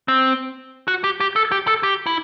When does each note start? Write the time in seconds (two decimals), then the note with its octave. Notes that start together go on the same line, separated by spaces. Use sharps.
0.08 C4
0.88 F#4
1.04 G4
1.20 G4
1.36 A4
1.52 G4
1.67 A4
1.83 G4
2.06 E4